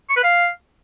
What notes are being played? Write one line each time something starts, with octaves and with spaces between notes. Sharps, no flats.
C#6
B4
F5